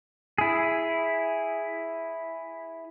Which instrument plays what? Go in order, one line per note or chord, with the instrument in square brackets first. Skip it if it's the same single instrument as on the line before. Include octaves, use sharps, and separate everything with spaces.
[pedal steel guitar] E4 G#4